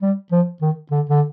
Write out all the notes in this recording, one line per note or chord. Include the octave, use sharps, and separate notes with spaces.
G3
F3
D#3
D3
D3